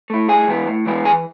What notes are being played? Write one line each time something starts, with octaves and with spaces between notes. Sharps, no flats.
A3 E4
A2 G#4 G#5
E3 G#3 B3 E4
A2
E3 G#3 B3 E4
E3 G#4 G#5